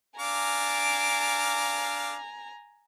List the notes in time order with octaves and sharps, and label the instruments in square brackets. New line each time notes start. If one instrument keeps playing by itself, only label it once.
[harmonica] D4 F5 D6 [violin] G#5 A#5